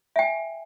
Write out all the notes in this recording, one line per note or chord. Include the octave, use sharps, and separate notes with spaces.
E5 G5 G#5